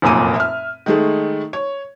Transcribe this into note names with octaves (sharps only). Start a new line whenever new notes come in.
F1 F#2 A#2 A#3 D#7
E5 F6
D#3 G#3 A3
C#5